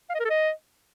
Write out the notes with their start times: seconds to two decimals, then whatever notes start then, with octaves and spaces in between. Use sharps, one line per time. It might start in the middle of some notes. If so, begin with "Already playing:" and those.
0.09 F5
0.15 D#5
0.20 A#4
0.25 A4
0.30 D#5